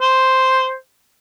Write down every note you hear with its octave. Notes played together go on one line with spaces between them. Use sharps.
C5